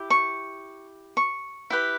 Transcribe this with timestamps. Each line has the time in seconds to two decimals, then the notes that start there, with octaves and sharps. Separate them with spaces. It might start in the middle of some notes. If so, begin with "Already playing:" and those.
Already playing: E4 G4
0.10 C#6
1.17 C#6
1.70 E4 G4 B4